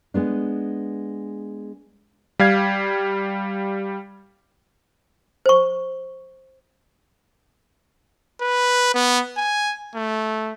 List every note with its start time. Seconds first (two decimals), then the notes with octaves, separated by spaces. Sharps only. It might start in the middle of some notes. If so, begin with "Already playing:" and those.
0.14 G#3 B3 D4
2.39 G3 F5 G#6
5.46 C5 C#6
8.41 B4
8.94 B3
9.37 G#5
9.94 A3